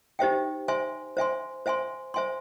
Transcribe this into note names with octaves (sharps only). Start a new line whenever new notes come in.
D#4 G4 C5 E5 G5
C5 E5 G#5 C6
C5 E5 G#5 C6
C5 E5 G#5 C6
C5 E5 G#5 C6